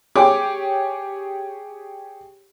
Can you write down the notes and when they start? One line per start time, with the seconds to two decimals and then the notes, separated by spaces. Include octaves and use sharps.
0.16 G4 G#4 C#5 D6